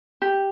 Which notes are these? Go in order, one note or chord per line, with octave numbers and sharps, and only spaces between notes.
G4